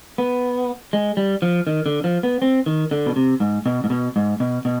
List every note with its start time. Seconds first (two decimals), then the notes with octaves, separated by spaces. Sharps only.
0.18 B3
0.93 G#3
1.17 G3
1.42 F3
1.67 D#3
1.86 D3
2.04 F3
2.23 B3
2.42 C4
2.66 D#3
2.91 D3
3.06 B2
3.16 C3
3.40 G#2
3.66 B2
3.84 G#2
3.90 B2
4.16 G#2
4.40 B2
4.65 B2